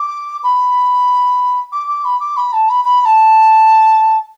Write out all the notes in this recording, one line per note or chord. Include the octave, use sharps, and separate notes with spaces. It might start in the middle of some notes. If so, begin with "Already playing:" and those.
Already playing: D6
B5
D6
D6
B5
D6
B5
A5
B5
B5
B5
A5